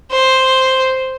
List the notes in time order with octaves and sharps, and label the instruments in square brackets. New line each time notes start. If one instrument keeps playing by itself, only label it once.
[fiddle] C5